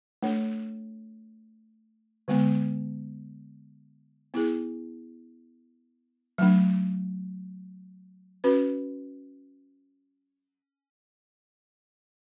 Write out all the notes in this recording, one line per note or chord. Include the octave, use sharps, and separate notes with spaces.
A3 D4 A4 C#5
D3 G#3 B3
B3 E4 G#4
F#3 A3 D4
C#4 F#4 B4